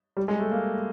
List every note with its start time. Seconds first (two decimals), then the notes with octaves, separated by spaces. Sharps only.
0.17 G3
0.28 G#3
0.39 A3
0.51 A#3